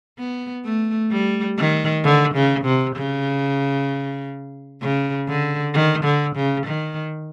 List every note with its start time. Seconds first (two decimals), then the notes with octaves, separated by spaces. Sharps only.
0.18 B3
0.65 A3
1.11 G3
1.57 D#3
2.04 D3
2.35 C#3
2.65 C3
2.96 C#3
4.82 C#3
5.27 D3
5.74 D#3
6.04 D3
6.36 C#3
6.66 D#3